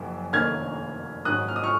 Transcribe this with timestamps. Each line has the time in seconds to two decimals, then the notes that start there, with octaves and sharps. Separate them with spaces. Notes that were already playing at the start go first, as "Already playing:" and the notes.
Already playing: F#1 F#2 F3
0.33 F1 D#2 D#3 A#3 C#4 F6 G#6
1.25 G#1 G#2 D#3 F#3 C#4 D#6 F#6
1.48 F6
1.56 D#6
1.63 C#6 F6